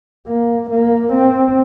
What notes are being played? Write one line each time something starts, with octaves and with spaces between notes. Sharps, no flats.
A#3
A#3
C4